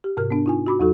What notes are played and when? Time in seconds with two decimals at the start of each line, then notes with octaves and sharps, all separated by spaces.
0.04 G4
0.17 G#2 C3 A#4 F6
0.30 B3 D4
0.46 D#4 F4 G#5
0.66 F#4 B5 D6
0.80 E2 F#3 D#4 F#4 A4